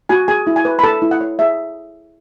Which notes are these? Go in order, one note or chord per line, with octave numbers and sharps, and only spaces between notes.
F#4 G#5
G#4 G#5
E4
G#5
B4
B5
A4 A5
E4
F#5
C#5
G#4 E5